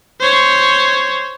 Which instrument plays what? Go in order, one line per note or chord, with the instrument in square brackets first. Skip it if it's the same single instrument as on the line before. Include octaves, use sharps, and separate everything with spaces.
[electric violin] C5 C#5